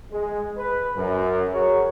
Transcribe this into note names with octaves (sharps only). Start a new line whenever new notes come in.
G#3
B4
F#2
F#4 G#4 A#4 C#5